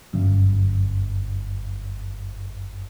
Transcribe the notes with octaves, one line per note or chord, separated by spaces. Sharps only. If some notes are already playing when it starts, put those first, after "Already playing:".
G1 F#2